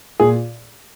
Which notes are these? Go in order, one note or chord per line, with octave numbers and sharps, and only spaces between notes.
A#2 G#4